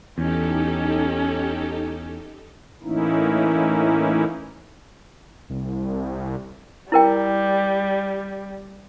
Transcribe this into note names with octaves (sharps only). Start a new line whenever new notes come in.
E2 C#4 D#4 G4 A4
A2 E3 A#3 C#4 D#4 E4
C2
G3 E4 A#4 G5